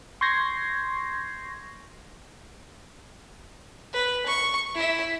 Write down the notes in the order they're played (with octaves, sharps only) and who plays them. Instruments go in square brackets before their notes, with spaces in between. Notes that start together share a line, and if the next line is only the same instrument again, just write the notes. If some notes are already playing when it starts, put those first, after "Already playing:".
[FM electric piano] C6 C#6 G6 G#6 A#6 C7
[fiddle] B4
C#6
E4 E5